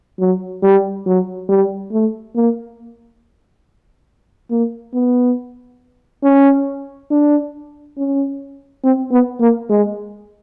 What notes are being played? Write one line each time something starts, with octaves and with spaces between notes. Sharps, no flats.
F#3
G3
F#3
G3
A3
A#3
A#3
B3
C#4
D4
C#4
C4
B3
A#3
G#3